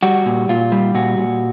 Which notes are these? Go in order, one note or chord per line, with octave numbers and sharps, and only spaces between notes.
G3 F#4
A#2
A#2 F4
G3
A#2 F#4
A#2